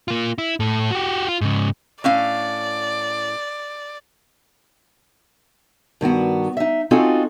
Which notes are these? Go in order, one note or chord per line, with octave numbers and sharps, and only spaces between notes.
A#3 F4
E4
A2 A4
F#4 G4
F4
G#2 C#3
A2 C#4 D5 F5
G2 D#3 B3 F#4
D#4 E5
C4 C#4 D#4 F4 F#4 A4